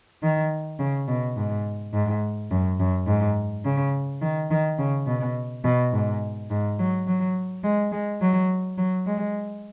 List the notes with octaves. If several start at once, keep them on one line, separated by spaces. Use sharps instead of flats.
D#3
C#3
B2
G#2
G#2
F#2
F#2
G#2
C#3
D#3
D#3
C#3
B2
B2
G#2
G#2
F#3
F#3
G#3
G#3
F#3
F#3
G#3